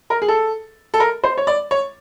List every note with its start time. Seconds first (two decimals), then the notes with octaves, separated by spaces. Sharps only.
0.10 A#4
0.22 G#4
0.28 A4
0.94 A4
1.00 A#4
1.24 C5
1.37 C#5
1.47 D5
1.71 C#5